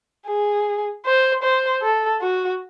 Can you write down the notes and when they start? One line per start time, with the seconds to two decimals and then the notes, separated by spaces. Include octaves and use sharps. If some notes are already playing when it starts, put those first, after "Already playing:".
0.27 G#4
1.05 C5
1.43 C5
1.82 A4
2.21 F#4